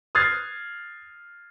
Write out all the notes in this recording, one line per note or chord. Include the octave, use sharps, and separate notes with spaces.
D#6 F6 F#6 G#6 A6 C7